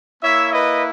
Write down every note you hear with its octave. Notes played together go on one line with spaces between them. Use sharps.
A#3 E4 C#5 E5
B4 D#5